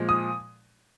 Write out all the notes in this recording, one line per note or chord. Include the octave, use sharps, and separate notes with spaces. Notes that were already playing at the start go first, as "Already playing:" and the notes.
Already playing: A#2 F3 G#3
D#6